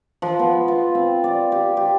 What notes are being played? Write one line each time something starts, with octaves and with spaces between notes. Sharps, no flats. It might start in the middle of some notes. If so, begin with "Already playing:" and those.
F3
B3
F4
C4
D5
G4
G4